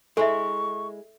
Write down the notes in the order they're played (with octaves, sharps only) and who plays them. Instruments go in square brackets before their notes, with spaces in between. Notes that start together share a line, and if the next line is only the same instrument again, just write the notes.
[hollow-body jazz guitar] G#3 E4 [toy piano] A4 E5 [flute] C#6